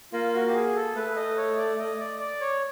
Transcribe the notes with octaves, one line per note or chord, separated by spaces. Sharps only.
A#3 F4
F#4
G4
G#4
A4
A3 B4
D#5
C#5
D5
D#5
D5
D5
C#5